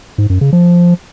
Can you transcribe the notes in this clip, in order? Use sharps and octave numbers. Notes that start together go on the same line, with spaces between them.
G#2
F#2
C#3
F3